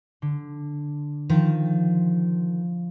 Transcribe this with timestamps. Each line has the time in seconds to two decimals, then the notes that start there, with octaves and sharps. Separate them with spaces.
0.22 D3
1.29 D#3 F3